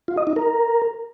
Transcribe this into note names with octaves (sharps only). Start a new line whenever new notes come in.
F4
D#5
D#4
A#4